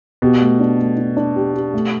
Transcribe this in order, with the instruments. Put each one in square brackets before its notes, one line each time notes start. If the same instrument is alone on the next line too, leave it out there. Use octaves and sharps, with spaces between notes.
[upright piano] B2 [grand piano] G4
[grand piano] A3
D4
A3
D4
D4
G4
G4
A3